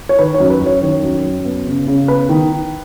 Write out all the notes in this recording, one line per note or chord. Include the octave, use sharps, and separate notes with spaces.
C#5
D#3 B4
C#5
F#2
B4
F#2
C#5
D#3 C#5
F#2
F#2
B3
C#3
C#3
B3 B4
D#3
D#3